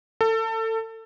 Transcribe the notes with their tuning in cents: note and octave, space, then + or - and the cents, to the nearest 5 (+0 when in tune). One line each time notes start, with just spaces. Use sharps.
A4 +25